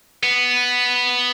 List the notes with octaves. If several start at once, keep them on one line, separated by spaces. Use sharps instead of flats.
B3